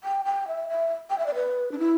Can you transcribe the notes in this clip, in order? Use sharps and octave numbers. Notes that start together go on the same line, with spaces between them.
G5
G5
E5
E5
G5
E5
D5
B4
D4
E4